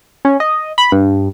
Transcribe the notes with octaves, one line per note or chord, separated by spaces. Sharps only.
C#4
D#5
B5
G2